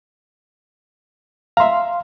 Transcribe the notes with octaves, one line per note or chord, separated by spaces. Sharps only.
E5 F5 A#5 C6